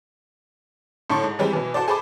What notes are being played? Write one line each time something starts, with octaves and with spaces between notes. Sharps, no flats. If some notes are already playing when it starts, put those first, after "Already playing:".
A2 D3 A4 C6 C#6
G#2
E3 G3 G#3 C4
B2 E3
F#4 A4 C5 D5
G#4 A4 C5 B5 D6